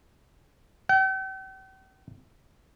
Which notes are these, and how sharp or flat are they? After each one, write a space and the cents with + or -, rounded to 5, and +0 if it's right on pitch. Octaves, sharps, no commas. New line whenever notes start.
G5 -45